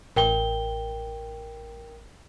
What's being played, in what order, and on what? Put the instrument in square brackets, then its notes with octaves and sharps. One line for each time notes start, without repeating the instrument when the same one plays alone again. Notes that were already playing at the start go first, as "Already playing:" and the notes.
[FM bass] A1 [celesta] A#4 G5 G7